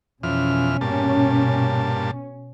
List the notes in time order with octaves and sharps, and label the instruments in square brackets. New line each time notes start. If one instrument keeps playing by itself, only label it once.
[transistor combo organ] F2 E3 F6 [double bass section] B2 C#4
[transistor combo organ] G2 A#2 A5